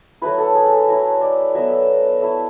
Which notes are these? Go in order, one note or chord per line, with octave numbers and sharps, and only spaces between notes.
F#3 A3 E4 B4
A4
G#4
A4
F#3 A3 E4
D5
F#3 B3 E4 E5
E5
A3 E4